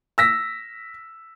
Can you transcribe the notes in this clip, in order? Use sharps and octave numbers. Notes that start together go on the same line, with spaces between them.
E6 A#6 B6